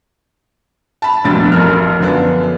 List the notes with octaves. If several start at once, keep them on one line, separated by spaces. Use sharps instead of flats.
A5 B5
F1 A#1 G2 B2 A6
A1 F2 A#4 F6
F#2 D3 F3 B3 D4